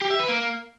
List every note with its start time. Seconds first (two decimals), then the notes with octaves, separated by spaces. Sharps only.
0.02 G4
0.11 E5
0.20 B4
0.28 A#3